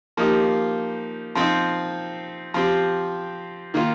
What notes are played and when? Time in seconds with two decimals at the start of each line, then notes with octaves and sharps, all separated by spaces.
0.17 F3 A#3 D#4 G4
1.35 F3 C4 D#4
2.54 F3 C4 G4
3.74 D#3 A#3 F4